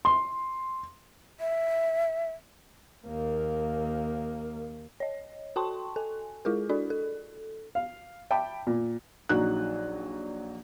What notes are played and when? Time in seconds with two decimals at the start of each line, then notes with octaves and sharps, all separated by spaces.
0.05 C6
1.40 E5
3.06 D#2 A#3
5.00 C#5 D#5
5.56 F#4 A4 G5 A5 C6 C#6
5.96 A4 G#5
6.45 G#3 E4 F4 G#4 A#4
6.69 D4 E4 F#4 A4 D5
6.90 A4
7.75 F5
8.30 E5 G5 A5 B5 D6
8.67 A#2
9.29 A#1 F#3 D#4 F#6